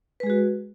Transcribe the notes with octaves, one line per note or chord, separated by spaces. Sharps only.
G#3 F#4 G#4 B4